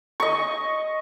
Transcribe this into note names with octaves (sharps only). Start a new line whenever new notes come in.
D#5 C#6